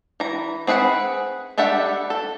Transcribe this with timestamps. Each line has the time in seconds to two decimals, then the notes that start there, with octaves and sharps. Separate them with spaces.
0.20 E3 A#5
0.67 C4 G#4 B4 F5 F#5
1.58 G3 D4 A4 E5 F#5
2.10 A4